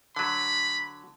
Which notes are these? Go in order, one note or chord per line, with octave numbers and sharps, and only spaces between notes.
D3 F#3 B5